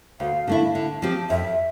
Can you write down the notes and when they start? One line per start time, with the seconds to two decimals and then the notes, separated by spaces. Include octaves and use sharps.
0.20 D2 F5
0.47 D3 A3 E4
0.75 D3
1.02 F3 C4 G4
1.30 F2 E5